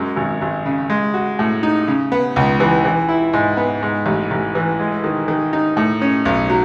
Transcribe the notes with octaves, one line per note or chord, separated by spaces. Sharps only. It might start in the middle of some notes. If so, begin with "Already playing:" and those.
Already playing: F#2 G#3
G#1
G#1
C#3
G#3
F#4
A2
D#4
C#3
B3
C#2
E3
E3
E4
G#2
B3
G#2
A1
A1
E3
G#3
D#3
D#3
D#4
A2
C#4
B1
F#3